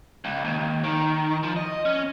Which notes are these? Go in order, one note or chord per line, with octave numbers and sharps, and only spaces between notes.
C#2
D#2
D#3
F3
D#5
C#4